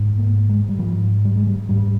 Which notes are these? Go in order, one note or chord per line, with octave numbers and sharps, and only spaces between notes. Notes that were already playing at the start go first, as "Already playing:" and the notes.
Already playing: G#2
A#3
G#3
G3
G#2 F3
G3
G#3
G3
G#2 G3